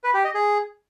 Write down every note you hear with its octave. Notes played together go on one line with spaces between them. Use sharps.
B4
G4
D#5
G#4